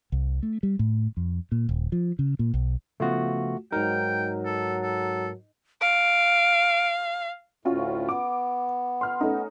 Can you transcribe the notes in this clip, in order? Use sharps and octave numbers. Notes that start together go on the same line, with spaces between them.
C2
A3
G3
A2
F2
A#2
D#1
F3
C#3
A#2
B1
C#3 F3 A3 B3 F4 F#4
G#2 F#3 D#4 A#4 G5
A4
A4
F5 D7
D2 A2 C#4 F4 F#4
B3 D6
C6 F6
A3 C#4 D#4